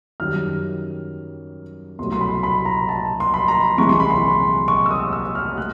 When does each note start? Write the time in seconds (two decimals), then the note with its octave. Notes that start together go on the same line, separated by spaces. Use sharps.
0.20 F#2 D#3 G3 F6
1.99 C2 B2 F#3 A3 C6
2.12 C6
2.21 B5
2.43 B5
2.66 A#5
2.89 A5
3.20 C6
3.34 B5
3.48 A#5
3.78 C2 C3 E3 G#3 C#6
3.89 C6
4.00 B5
4.10 C6
4.68 C#6
4.86 E6
4.91 D#6
5.13 E6
5.35 F6
5.58 G#3 F#6